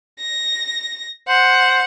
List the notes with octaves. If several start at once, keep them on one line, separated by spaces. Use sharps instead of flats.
A#6
C5 F#5